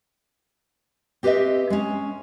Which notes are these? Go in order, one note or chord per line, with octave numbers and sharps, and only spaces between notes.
C4 G4 B4 C#5 D#5 E5
G#3 C#4